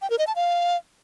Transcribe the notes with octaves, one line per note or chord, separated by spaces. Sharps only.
G5
A#4
D#5
A5
F5